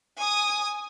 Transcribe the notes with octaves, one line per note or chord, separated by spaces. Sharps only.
G#5 D#6